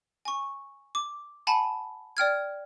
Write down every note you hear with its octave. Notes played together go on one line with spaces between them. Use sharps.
G#5 C#6
D6
F#5 G#5 A5 B5
D5 G5 F6 G#6